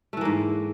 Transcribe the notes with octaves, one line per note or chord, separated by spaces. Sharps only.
G#2 E3 A3 A#3